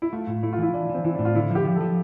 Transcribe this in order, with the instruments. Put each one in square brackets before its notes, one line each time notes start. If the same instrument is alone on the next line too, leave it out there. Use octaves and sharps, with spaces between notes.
[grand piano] E4
[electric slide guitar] A3 [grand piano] F4
[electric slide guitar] A2
[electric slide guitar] A3 [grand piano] E4
[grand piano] F4
[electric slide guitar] E3 [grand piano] E4
[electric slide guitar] E3 [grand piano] D4
[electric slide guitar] E3 [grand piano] C4
[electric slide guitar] E3 [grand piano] E4
[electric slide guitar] A2 [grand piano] D4
[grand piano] F4
[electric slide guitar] D3 [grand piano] E4
[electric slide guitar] F3
[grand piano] G4
[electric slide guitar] F3
[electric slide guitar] F3 [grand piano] A4